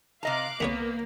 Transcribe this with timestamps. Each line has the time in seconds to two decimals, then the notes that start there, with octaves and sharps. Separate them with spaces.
0.23 C3 D#5 F5 A#5 D6 F#6
0.60 C2 A#3 B3 G#4 C#5